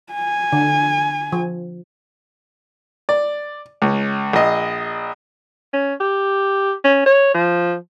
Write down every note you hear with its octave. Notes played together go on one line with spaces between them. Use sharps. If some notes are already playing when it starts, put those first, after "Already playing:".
G#5
D3
F3
D5
C#2
A#1 D#5
C#4
G4
C#4
C#5
F3